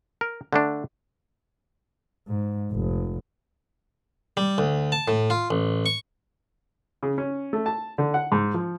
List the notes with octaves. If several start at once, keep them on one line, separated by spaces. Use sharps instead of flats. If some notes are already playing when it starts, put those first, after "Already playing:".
A#4
D3 A3 D4
G#2
F1
G3
D2
A5
A2
F4
A1
C#6
C#3
C#4
A3
A5
D3
F#5
G#2
F3